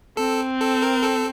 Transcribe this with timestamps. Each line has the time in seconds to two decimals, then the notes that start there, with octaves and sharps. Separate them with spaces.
0.17 C4 A4
0.60 A4
0.82 A#4
1.03 A4